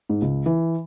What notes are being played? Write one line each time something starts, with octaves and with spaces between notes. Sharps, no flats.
G#2
C#2
E3